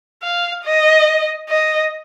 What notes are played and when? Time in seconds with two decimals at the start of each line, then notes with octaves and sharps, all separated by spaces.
0.23 F5
0.65 D#5
1.49 D#5